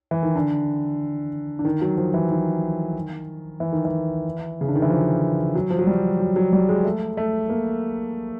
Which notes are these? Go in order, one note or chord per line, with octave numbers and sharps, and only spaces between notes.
E3
D#3
D3
D3
D#3
F#3
F3
E3
D#3
E3
D#3
E3
C#3
D3
D#3
E3
F3
F#3
F3
F#3
G3
F#3
F#3
G3
G#3
A3
A3
A#3